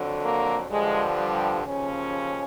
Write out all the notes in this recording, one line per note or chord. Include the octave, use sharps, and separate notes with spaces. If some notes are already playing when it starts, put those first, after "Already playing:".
Already playing: F2 D3 F#3
A#3
G2 D3 F3 G#3
G3
D#2 C#3 F3 C#4